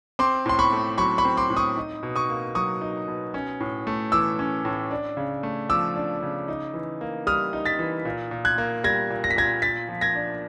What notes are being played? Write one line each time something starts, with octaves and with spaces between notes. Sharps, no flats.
C4 C6 D6
A2 C6
B5 C#6
A3
F#3 B5 C#6
B5 C#6
C4
C6 D6
A2
C#6 D#6
D#4
B2
C#6 D#6
A#3
F#3 C#6 D#6
D#4
B2
C#4
A2
A3
E3 D6 E6
C#4
A2
D4
C#3
A3
F3 D6 E6
D4
C#3
D#4
E3
A#3
G3 D#6 F6
D#4
A6 B6
E3
A#2
A#2
F#6 G#6
A#3
G3 G#6 A#6
A#2
A#6
B6
A#2 G#6 A#6
F4 A6 B6
F3
G#6 A#6
D4